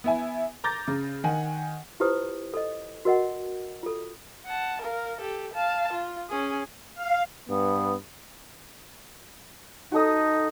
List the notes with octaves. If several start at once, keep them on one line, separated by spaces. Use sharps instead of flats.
B3 E4 G#5
A#5 D6 G6 A6 A#6
C#3
D#3 F#5 G#5
E4 F4 G4 B4 C5 D#6
A4 D#5
F#4 A#4 D#5 F#5
F4 A4
F#5 A5
A#4 F5
G4 A4
F5 A5
F4
C#4 G#4
F5
G2 B3
D#4 F#4 A4 D#6